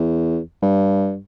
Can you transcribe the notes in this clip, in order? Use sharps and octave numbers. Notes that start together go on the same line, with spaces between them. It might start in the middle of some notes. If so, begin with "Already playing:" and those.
Already playing: E2
G2